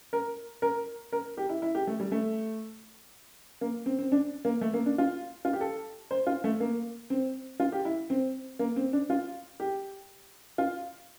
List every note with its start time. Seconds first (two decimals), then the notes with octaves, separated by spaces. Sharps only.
0.13 A#4
0.62 A#4
1.12 A#4
1.37 G4
1.49 E4
1.62 E4
1.75 G4
1.87 A3
2.00 G3
2.12 A3
3.61 A#3
3.86 C4
3.99 C4
4.12 D4
4.45 A#3
4.61 A3
4.74 A#3
4.86 D4
4.98 F4
5.45 F4
5.53 G4
5.61 A4
6.11 C5
6.27 F4
6.44 A3
6.60 A#3
7.10 C4
7.60 F4
7.72 G4
7.85 E4
8.10 C4
8.59 A#3
8.76 C4
8.93 D4
9.10 F4
9.60 G4
10.58 F4